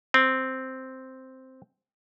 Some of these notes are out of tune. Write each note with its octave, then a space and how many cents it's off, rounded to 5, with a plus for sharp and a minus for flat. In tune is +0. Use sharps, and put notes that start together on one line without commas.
C4 +0